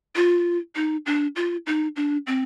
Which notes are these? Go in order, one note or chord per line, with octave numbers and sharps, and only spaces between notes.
F4
D#4
D4
F4
D#4
D4
C4